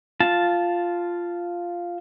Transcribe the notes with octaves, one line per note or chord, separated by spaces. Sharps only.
F4 A5